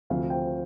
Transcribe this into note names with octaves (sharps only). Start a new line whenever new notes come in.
D2 C3 F3 C4 F5
G5